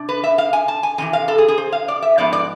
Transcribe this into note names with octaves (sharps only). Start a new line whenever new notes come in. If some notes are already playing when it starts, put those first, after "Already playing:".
Already playing: C3 D4
B4
E5
F5
G#5
A5
G#5
F2 C3 E3 G#5
F5
A4
G#4
G#4
C5
F5
D5
E5
G#2 F3 B3 D5
D5